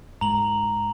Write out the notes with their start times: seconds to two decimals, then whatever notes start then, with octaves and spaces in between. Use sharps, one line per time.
0.21 G#2 A#5 F#7